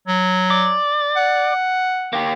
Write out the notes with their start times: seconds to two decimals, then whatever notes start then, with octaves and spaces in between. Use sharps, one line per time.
0.07 F#3
0.50 D5
1.16 F#5
2.13 A#3 G4